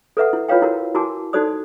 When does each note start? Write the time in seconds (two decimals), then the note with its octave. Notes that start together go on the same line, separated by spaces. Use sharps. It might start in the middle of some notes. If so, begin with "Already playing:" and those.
0.17 A4 B4 E5 F#5
0.33 E4
0.48 E4 F4 B4 C#5 F5 G5
0.62 E4 F#4 A#4
0.95 E4 F#4 A#4 G#5 A5 D6
1.33 D#4 F#4 A4 C5 D5 D#6